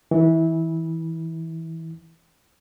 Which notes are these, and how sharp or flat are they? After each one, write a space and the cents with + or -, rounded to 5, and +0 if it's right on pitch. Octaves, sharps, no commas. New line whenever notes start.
E3 -20